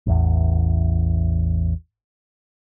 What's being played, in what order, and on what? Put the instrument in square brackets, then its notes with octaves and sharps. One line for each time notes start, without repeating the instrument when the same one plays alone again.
[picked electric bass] A1 E2